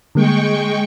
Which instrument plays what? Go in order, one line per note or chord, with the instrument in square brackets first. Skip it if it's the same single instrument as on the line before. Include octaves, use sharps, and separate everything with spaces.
[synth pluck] D3 G3 A#3 [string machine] G#3 G5 C#6